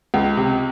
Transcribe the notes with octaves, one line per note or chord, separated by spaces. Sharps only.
C#2
C3